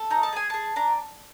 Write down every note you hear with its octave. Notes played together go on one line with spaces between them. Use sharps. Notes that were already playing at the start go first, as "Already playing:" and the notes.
Already playing: A4
D#4 A#5
A5
G#4 G#5
G#4 A5
D4 A#5